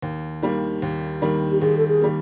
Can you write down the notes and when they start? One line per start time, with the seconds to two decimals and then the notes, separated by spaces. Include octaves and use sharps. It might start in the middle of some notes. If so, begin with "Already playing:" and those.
0.02 D#2
0.42 D#3 G3 A#3
0.82 D#2
1.22 D#3 G3 A#3
1.51 G4
1.61 D#2 G#4
1.77 A4
1.88 G#4
2.01 D#3 G3 A#3